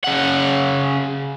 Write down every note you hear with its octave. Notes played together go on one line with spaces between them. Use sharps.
C#3 F#5